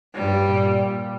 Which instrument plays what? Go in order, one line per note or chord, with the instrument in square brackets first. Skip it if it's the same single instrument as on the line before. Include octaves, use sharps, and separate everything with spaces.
[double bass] G2 [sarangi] G3
[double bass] A#2